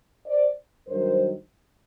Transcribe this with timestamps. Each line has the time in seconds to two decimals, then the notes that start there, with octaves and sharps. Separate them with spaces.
0.26 C5 D5
0.88 G2 D#3 F#3 A#4 C5